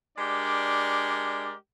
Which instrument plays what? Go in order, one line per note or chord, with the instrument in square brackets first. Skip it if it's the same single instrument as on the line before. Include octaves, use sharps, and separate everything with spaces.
[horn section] G#3 D4 G4 A#4 D5